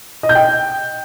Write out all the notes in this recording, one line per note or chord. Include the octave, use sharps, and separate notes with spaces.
D#5
G6
G5